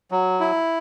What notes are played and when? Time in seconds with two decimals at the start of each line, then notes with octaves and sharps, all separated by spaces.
0.11 F#3
0.40 E4